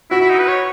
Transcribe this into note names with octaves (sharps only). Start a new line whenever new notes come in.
E4 F#4
E4
D#4
B4
C#5